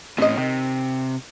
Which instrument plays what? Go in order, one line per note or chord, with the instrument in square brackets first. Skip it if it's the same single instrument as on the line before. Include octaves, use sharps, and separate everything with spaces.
[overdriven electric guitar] A2 C#4 [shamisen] C4 D#5
[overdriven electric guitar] C3 [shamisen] D#3